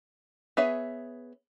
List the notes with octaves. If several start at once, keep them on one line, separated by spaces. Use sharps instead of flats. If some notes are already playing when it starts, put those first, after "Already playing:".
B3 G#4 C#5 E5